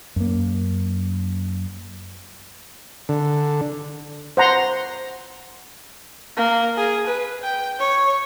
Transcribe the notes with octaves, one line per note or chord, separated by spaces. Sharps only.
F#2 A#3
D3
C5 F#5 A#5 C6
A#3
G#4
B4
G5
C#5